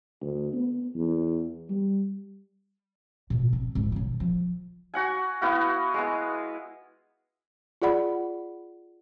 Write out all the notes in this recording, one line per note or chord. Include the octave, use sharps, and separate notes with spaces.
D2
B3
E2
G3
G#2 B2
C4
C2 G#2
B1 D#3
F3
F#4 F#5 G#5
B3 E4 F#4 F5
G#3 B3
F4 G#4 D5 F#5 B5